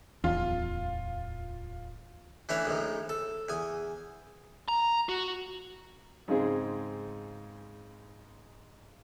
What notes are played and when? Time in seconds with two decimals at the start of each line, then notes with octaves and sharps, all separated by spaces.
0.24 D1 E2 F4
2.49 E3 A3 C#4 D4 B4 C#5
2.65 A#1 A2 D#3
3.09 A4
3.49 E2 G#5 D#6
4.68 A#5
5.09 F#4
6.28 G#2 C#3 G#3 C4 G#4